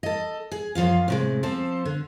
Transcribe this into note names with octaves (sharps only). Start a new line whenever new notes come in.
A4 D#5
G#4
F#2 F3 F4 F5
A2 C3 G#3
F3 C4 A4 C5
D3